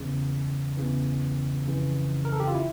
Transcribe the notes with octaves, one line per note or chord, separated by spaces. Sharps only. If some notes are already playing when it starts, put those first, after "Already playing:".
Already playing: E2 C#3 E3
E2 C#3 E3
F2 C#3 E3
A#4
A4
G4
F4
E4